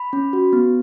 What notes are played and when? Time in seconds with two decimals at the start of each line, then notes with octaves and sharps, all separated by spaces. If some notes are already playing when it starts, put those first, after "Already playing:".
Already playing: B5
0.13 C#4
0.33 F#4
0.53 B3